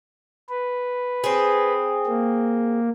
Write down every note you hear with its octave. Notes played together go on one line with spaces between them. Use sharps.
B4
C4 G#4
A#3